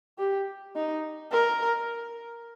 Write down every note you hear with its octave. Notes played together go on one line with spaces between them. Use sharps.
G4
D#4
A#4